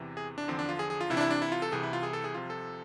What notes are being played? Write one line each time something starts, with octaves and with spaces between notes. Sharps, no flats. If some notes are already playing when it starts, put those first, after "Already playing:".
Already playing: E2 C3 E3
G#4
D4
E2 D3 F3 C4
D4
F4
G#4
G#4
F4
C2 C3 E3 E4
D4
E4
D4
E4
F4
A4
C2 C3 E3 G#4
E4
F4
G#4
A4
G#4
C2 C3 F3 F4
A4